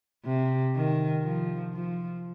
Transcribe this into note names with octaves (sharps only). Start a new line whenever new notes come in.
C3
D#3
F3
F3